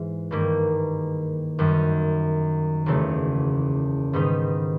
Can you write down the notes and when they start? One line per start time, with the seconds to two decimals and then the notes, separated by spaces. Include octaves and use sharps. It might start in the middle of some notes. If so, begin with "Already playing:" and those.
Already playing: G#2 E3 G#3
0.31 G2 D#3 G3 A#3
1.59 F#2 D#3 G3
2.86 F#1 E2 C#3 F#3 A3
4.13 G#2 D#3 G3 B3 D#4